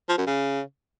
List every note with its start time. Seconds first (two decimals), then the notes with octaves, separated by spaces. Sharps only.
0.09 F3
0.18 F#2
0.27 C#3